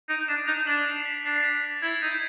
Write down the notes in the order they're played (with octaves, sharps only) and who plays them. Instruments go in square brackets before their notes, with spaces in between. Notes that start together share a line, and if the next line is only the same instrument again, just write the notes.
[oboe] D#4 [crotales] D7
[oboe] D4 [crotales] E7
[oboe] D#4 [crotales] F7
[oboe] D4 [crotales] F#7
[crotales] C7
B6
[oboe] D4 [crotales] C7
[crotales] B6
A6
[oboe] E4 [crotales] G#6
[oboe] D#4
[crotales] G6